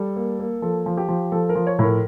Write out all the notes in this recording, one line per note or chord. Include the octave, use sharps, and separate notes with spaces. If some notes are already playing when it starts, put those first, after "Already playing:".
Already playing: G3 A4
A#3
A#3
F3 A4
F3
G4
F3
F3 A4
A#4
F3
C#5
A2 A#4